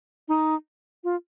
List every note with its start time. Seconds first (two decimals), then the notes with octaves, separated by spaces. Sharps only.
0.28 D#4
1.04 F4